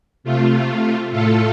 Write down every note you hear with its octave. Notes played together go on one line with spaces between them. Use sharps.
C3 A3 F4
A2 A3 F4 A4